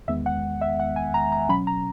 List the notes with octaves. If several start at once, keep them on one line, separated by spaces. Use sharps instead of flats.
E2 D#3 G#3 B3 E5
F#5
E5
F#5
G#5
A#5
A#5
B2 F#3 C#4 B5
A#5